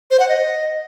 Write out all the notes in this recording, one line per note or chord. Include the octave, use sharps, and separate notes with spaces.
C5
F#5
D#5